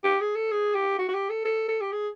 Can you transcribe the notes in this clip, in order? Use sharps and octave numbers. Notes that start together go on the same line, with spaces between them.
G4
G#4
A4
G#4
G4
F#4
F#4
G4
A4
A4
A4
G4
G#4